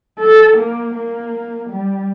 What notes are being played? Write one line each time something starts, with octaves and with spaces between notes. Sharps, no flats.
A4
A#3
A#3
G3